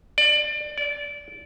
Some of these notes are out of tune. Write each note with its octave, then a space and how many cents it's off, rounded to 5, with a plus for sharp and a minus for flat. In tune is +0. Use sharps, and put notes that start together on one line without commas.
D5 +25
D5 -20